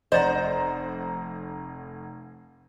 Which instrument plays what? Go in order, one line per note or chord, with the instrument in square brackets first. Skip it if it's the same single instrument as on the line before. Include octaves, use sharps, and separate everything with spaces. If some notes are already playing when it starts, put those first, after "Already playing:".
[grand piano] F1 F#5 A#5 [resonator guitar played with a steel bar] C5 [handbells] D5 D#5